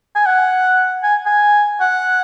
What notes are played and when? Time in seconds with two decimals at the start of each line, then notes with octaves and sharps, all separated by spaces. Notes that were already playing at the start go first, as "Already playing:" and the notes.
0.16 G#5
0.26 F#5
1.04 G#5
1.26 G#5
1.81 F#5